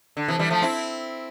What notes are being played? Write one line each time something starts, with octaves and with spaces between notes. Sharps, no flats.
D3
C3 E3
E3 G3
F3 A3
C4 E4